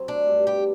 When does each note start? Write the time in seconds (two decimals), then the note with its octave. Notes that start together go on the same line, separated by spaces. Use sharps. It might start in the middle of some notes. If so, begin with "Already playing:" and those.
Already playing: F#3 C4
0.08 A3 D4
0.28 G2
0.47 B3 G4